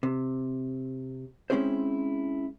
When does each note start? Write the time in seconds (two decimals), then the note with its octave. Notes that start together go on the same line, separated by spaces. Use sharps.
0.03 C3
1.50 G#3 C4 C#4 E4 G#4 C5